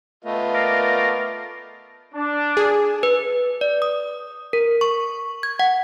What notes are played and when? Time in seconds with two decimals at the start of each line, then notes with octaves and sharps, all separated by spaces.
0.25 A3 B3 F4 D#5
0.54 A#4 D5 F5
2.15 D4
2.57 G#4
3.03 B4
3.61 D5
3.82 D#6
4.53 A#4
4.81 C#6
5.43 G#6
5.59 F#5